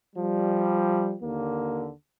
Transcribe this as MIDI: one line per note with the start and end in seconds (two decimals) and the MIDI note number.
0.15 1.15 53
0.15 1.15 55
1.22 1.91 39
1.22 1.91 50
1.22 1.91 58